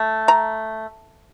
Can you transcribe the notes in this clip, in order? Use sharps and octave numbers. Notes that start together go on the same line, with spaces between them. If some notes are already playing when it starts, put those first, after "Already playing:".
Already playing: A3
A#5